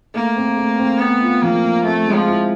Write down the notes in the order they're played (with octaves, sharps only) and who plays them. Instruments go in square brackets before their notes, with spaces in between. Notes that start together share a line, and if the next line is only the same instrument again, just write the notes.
[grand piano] A3 [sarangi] A#3
[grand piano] C4
A3
C4
[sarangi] B3 [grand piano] C4
[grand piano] F4
[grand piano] F3 [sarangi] A#3
[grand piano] F3
[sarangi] A3 [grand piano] C4
[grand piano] G#3
[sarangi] F3
[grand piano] E4